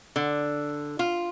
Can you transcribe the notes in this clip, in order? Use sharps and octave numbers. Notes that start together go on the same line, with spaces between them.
D3
F4